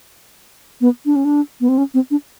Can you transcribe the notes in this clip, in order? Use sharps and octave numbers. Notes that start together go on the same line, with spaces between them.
B3
D4
C#4
D4
B3
C4
C#4
C4
D4